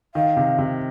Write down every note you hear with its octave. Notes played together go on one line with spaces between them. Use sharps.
D#3 F5
C3
C3